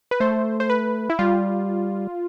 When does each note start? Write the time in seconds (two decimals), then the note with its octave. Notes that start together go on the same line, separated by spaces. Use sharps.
0.11 B4
0.20 A3 C5
0.60 C5
0.70 B4
1.10 E4
1.19 G3 F4